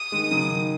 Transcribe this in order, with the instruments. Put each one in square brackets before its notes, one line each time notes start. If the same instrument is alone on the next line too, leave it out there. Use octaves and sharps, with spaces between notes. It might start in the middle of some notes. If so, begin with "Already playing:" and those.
Already playing: [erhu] D#6
[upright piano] D#3 G#3
C#3 F#3
D#3